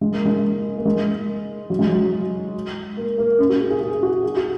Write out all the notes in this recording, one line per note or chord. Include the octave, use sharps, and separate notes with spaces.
G#3
A#3
G#3
A#3
G#3
F#3
G#3
F#3
A#3
A#3
C#4
F#4
G#4
G#4
G#4
F#4
G#4
F#4